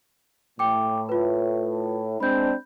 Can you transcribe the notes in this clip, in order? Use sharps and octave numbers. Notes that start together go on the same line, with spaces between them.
A2 G5 D6
F4 B4
G#3 C4 D4 B5 G6